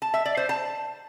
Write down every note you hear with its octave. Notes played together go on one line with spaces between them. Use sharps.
A5
E5
D5
C5
A5